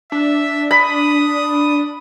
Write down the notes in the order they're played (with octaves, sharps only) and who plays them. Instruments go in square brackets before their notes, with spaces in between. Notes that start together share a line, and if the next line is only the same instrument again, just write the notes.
[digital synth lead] D4 [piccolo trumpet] E5
[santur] B5 [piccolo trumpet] D#6